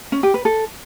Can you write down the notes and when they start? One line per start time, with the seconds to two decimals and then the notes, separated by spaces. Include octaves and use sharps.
0.12 C#4
0.23 G4
0.34 B4
0.45 A4